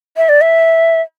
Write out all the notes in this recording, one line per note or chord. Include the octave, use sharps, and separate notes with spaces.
E5
D5
E5